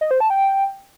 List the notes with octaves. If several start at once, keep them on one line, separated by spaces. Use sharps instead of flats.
D#5
C5
A5
G5